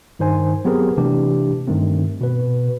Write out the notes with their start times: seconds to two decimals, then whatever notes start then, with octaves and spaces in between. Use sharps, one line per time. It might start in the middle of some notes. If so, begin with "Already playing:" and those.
0.19 G2 D#3 D#4 C5 G#5
0.65 F#3 B3 C4 G4 G#4 A#4
0.97 C3 E3 A3 D4 G4
1.67 G2 D#3 A3 C4
2.21 B2 B4